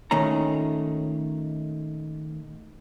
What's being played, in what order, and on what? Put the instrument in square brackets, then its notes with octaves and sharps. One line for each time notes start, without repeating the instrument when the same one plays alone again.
[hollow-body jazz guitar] A#2 D#3 A3 C#4 A#5